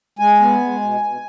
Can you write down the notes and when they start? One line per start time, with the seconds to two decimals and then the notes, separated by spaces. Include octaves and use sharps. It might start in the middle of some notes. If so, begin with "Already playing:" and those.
0.19 G#3 G#5
0.40 B3
0.60 G#3
0.80 B2
1.01 B2